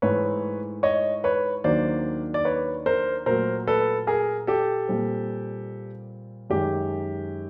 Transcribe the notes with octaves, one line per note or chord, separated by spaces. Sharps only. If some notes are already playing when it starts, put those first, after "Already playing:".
G#2 E3 A3 B4 C#5
C#5 D#5
B4 C#5
D#2 D#3 F#3 A#3 D4 C5 D5
D5
B4 C#5
A#4 C5
A#2 F#3 A3 A#4 C5
A4 B4
G#4 A#4
G4 A4
A#2 G3 C4
F#2 D#3 G#3 G4